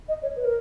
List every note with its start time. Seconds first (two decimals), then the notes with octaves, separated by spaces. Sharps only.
0.08 D#5
0.22 C#5
0.36 B4
0.45 A#4